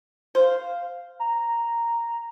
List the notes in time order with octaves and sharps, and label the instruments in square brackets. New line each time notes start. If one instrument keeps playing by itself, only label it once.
[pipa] C5 [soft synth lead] F5
[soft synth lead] A#5